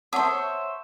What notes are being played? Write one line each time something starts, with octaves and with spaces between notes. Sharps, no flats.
C5 C#5 E5 F#5 A5 D#6